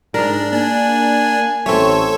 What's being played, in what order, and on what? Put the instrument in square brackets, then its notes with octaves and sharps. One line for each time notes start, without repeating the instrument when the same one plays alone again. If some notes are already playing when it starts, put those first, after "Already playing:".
[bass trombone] G#2 [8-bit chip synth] D4 [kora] G#4 A#4
[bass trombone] A#3 [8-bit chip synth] D4 [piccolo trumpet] G#5
[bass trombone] A1 [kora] A3 C4 [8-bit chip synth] A4 C#5